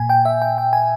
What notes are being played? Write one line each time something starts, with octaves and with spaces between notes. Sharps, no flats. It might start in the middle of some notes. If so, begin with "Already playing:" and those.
Already playing: A#2 G#5
G5
E5
G5
G5
G#5